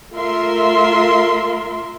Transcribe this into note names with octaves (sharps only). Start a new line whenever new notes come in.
A3 F4 A#4 E5 C6